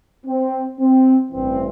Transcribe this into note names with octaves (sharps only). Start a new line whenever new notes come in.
C4
C4
A1 G2 E3 C4